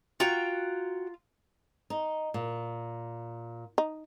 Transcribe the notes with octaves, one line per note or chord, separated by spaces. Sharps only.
F4 F#4 G5 A#5
D#4
A#2
D#4